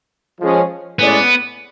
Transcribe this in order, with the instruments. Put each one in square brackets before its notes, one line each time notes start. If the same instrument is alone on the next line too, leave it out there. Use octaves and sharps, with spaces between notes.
[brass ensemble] F3 G#3 C#4 G#4
[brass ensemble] A2 G#3 C#4 G#4 D5 [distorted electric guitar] B3